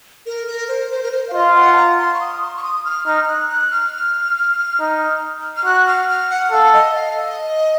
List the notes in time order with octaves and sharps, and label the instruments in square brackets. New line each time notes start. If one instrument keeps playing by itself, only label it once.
[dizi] A#4
A#4
C5
C5
A#4
C5
F5
[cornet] F4 [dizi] D#5
[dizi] F#5
A5
A#5
C6
C#6
D#6
C6
C#6
D#6
F6
[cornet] D#4 [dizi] F6
[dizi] F#6
F#6
F6
[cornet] D#4
[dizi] F6
[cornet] F#4 [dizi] F#6
[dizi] F6
F6
F#5
[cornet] A4 [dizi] F5
[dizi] D#5
F5
D#5